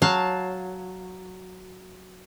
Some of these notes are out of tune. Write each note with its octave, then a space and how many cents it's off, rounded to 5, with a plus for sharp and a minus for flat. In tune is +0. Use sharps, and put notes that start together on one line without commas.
F#3 +0 F5 +10 A5 +0